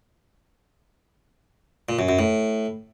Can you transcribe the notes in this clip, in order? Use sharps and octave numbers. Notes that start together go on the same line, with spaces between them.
A#2
F#2
F#2
A2